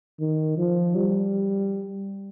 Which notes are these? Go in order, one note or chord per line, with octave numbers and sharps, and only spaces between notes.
D#3
F3
G3